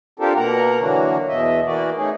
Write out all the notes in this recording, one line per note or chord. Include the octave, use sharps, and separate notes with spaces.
C4 D4 F4 G4 A4 A#4
B2 A#3 A#4 F#5 A#5
D3 E3 F#3 A#3 D4 F#4
E2 B2 D#5 E5
E3 A#3 F#4 D5
A3 C#4 D#4 G#4